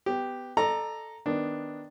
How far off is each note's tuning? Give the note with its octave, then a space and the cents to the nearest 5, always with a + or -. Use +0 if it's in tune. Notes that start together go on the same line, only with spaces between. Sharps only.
B3 +20 G4 +0
A4 +0 D5 +45 A#5 +0
D#3 +0 B3 +0 D4 +0